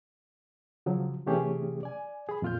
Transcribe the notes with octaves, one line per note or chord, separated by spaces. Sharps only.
C#3 F3 F#3
C3 E3 A3 C#4 G4 G#4
D5 G#5
G#4 B5
F2 A#2 F4 F6 G6